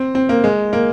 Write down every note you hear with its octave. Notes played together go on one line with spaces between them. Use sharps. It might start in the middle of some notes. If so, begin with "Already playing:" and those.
Already playing: C4
C4
A#3
G#3
A#3